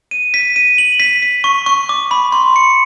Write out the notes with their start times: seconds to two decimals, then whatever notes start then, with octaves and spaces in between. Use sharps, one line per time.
0.11 D#7
0.34 B6
0.56 D#7
0.78 F#7
1.00 B6
1.22 B6
1.44 C#6
1.66 C#6
1.89 D6
2.11 B5
2.32 C6
2.56 C#7